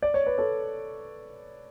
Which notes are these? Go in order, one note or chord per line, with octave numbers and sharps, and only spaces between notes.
D5
C#5
B4
A4 C#5